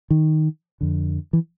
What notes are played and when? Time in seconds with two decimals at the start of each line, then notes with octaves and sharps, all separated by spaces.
0.11 D#3
0.81 F2 D3
1.33 E3